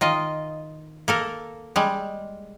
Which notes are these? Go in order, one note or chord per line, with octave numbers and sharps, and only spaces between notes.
D#3 F4 D#5
A#3 A4 A#4
G3 G#3